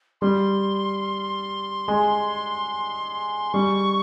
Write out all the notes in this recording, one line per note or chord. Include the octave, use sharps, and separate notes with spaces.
G3 C6
G#3
G3 C#6